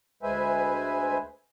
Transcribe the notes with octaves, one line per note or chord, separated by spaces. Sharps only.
D2 G#3 B4 C5 E5 G#5